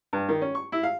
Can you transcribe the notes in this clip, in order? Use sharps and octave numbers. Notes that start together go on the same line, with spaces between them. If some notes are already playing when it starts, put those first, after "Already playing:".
G2
D#3
C#4
C#6
E4
F5